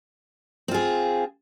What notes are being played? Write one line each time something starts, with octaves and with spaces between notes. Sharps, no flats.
C4 F4 G#4